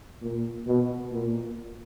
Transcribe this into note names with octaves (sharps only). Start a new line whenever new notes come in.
A#2
B2
A#2